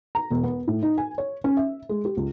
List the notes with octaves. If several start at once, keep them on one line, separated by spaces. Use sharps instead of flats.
A#5
E1
B3
A2
D#4
G#5
C#5
C#4
E5
G#3
G4
C#2